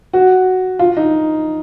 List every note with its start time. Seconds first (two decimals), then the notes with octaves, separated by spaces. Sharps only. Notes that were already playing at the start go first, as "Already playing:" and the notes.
0.13 F#4
0.79 F4
0.97 D#4